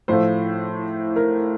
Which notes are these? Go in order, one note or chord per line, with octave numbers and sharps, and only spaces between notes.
A2 F3 A3 C5
A#4